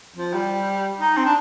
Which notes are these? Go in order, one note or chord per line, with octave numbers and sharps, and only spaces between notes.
F3
G3
D#4
C4
D4